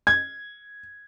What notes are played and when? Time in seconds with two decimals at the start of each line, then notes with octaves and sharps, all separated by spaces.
0.07 G#6